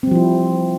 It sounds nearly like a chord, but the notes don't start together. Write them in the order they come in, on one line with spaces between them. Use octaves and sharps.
C4 G3 F3 E4